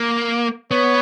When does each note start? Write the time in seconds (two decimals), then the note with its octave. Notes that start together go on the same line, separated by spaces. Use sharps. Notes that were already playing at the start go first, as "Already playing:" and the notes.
Already playing: A#3
0.71 B3 C#5